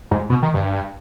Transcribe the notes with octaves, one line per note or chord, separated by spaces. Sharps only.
G#2
B2
D#3
G2